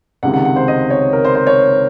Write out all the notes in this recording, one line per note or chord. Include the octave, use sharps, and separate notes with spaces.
C#2 C3 D#3 F#5
F#5
F#5
C5
D#5
C#5
A#4
C5
C5
C#5